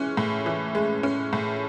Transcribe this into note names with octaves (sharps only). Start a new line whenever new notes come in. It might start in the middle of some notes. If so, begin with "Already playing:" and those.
Already playing: E3 G#3 C#4
A2
E3
G#3
C#4
A2